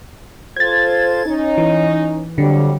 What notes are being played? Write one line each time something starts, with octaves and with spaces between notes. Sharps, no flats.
F4 A4 C5 G#6 A6
C#4 D#4
E3
F2 D3 F#3 G3